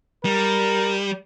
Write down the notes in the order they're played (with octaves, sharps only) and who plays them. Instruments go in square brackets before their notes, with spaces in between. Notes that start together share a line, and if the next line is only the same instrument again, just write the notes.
[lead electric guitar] G3 [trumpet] A#4